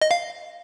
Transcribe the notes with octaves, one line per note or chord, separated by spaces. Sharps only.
D#5
F5